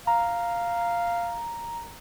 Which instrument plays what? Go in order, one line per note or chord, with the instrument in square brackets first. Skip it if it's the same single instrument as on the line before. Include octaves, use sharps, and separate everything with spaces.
[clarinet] F5 [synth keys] A#5